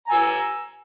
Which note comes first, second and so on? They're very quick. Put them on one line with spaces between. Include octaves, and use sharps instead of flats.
A#5 G#5 E6